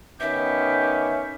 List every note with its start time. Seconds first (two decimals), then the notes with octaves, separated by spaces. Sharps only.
0.20 D#3 B3 C#4 G4 E5